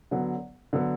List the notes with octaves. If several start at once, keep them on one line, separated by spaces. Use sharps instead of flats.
D3 F#3 B3
D3 F#3 B3